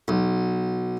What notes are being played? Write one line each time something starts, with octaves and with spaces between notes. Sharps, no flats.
B1